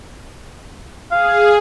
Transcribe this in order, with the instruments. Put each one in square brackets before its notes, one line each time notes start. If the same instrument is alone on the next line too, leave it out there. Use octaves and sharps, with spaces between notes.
[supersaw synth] G#4 [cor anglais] F5